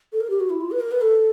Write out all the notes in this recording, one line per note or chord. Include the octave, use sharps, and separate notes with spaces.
A4
A#4
G4
F#4
E4
F4
B4
A#4
B4
A4